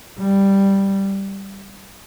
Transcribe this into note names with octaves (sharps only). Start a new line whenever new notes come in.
G3